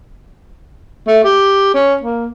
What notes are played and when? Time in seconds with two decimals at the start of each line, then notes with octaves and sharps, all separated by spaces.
1.07 A3
1.24 G4
1.74 C#4
2.03 A#3